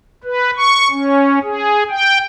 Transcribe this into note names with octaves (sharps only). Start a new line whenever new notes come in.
B4
C#6
C#4
G#4
G5